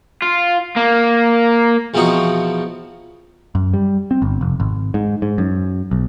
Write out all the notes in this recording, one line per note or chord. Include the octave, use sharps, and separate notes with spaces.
F4
A#3
E2 B2 F3 C4 D#4 C#6
F#2
G3
C4
G1
F1
G#1
G#2
G#2
F#2
B1